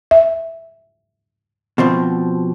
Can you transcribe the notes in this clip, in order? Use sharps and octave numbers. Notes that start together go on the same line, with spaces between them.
E5
B2 F3 C4